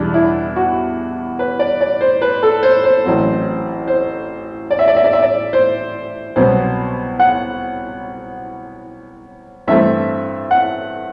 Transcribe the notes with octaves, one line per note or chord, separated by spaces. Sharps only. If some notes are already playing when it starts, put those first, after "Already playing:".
Already playing: E2 B2 G3 D4
E4
F#4
B4
D5
D5
C5
B4
A4
C5
C5
A1 A2 F#3 C4
C5
D5
E5
D5
E5
D5
E5
D5
C5
C2 B2 F#3 B3 C5
F#5
G2 E3 A3 C4 E5
F#5